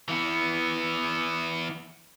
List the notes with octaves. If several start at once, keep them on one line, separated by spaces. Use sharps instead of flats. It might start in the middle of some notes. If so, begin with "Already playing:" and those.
E3 B3